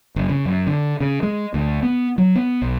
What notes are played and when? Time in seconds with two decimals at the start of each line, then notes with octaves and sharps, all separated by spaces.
0.16 F#1
0.29 C#3
0.45 F#2
0.67 D3
1.01 C#3
1.23 G#3
1.54 D2
1.83 B3
2.18 F#3
2.36 B3
2.62 B1